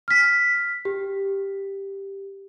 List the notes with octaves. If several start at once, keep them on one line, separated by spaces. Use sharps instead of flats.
F6 B6
G4